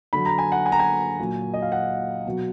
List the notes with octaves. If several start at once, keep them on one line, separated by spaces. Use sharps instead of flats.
D3 F#3 B5
A#5
G#5
F#5
G#5
A#5
G#5
A#2 F#3
D#5
F5
F#5
B2 F#3